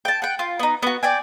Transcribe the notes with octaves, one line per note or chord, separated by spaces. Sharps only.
G5 A5
F#5 G5
F4
B3 D#4
B3 F#4
D5 G5 G#5